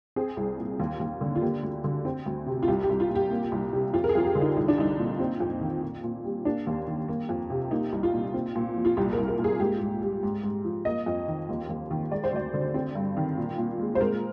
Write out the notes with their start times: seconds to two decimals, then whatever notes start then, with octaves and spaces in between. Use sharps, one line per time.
0.16 C4 G#4
0.37 C2
0.58 A#2
0.80 D#2
1.00 D#2
1.21 D3
1.35 F4
1.41 A#3 G4
1.63 D2
1.84 D3
2.05 C4
2.26 D2
2.47 C3
2.63 F4
2.68 C2 G4
2.83 G4
2.89 C2
3.00 F4
3.10 A#2
3.16 G4
3.31 A#3
3.52 C2
3.73 C3
3.93 F2 F4
4.04 A#4
4.09 G#4
4.15 F2 F4
4.25 G4
4.35 D3
4.42 D#4
4.56 C2 D#4
4.68 D4
4.78 C2 D#4
4.99 A#2
5.19 C4
5.40 F2
5.61 D#3
5.82 A#2
6.04 A#2
6.24 G3
6.45 A#3 D4
6.67 D#2
6.87 D#3
7.08 A#3
7.29 F2
7.50 C3
7.71 A#3 D#4
7.92 C2
8.03 F4
8.13 A#2
8.34 C4
8.56 A#2
8.76 F3
8.85 F4
8.97 C2 G4
9.13 A#4
9.18 C2
9.28 A#4
9.39 A#2
9.44 G#4
9.60 G#2 G4
9.82 G#2
10.02 G3
10.23 G#2
10.43 G#2
10.64 F3
10.85 A#3 D#5
11.06 F2
11.28 D#3
11.49 D#2
11.69 D#2
11.91 D#3
12.12 G#3 D5
12.24 C5
12.33 D2 D5
12.54 D3
12.74 C4
12.95 G2
13.17 D#3
13.38 A#2
13.58 A#2
13.79 G#3
13.95 C5
14.01 G#3 A#4